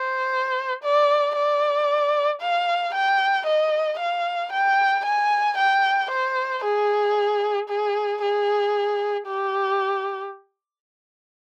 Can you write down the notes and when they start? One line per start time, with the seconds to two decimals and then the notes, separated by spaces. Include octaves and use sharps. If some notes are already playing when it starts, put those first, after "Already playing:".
Already playing: C5
0.84 D5
1.36 D5
2.42 F5
2.95 G5
3.47 D#5
4.00 F5
4.53 G5
5.05 G#5
5.58 G5
6.11 C5
6.64 G#4
7.69 G#4
8.22 G#4
9.27 G4